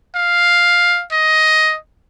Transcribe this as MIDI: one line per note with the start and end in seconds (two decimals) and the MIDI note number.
0.15 1.04 77
1.12 1.77 75